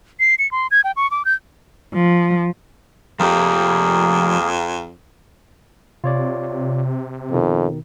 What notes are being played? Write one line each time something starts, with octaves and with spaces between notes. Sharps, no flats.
C7
C#7
C6
G#6
G5
C#6
D6
G6
F3
F2 F3 A#3 G4 G#4 A#4
C3 F4 C#5 D5
F2 B2 D#3